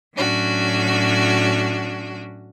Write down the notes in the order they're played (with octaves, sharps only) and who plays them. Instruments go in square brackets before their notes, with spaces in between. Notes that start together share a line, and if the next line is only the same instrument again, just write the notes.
[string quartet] A2 F#3 C#4 D4 F#4